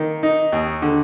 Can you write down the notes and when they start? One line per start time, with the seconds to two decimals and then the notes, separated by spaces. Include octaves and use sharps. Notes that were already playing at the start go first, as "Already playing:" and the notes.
Already playing: D#3 A#3
0.23 D#4
0.52 D#2
0.82 D3